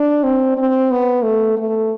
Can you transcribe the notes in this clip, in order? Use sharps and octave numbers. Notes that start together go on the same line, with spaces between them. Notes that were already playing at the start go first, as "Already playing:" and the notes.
Already playing: D4
C4
C4
B3
A3
A3